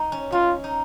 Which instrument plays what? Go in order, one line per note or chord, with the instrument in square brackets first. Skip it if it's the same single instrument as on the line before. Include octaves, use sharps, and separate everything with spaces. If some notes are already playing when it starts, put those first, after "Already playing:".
Already playing: [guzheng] D#4
C#4
[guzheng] C#4 [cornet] F4
[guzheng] D#4